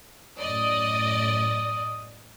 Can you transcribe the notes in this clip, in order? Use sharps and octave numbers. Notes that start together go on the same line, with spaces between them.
F#2 A2 D5 D#5 D#6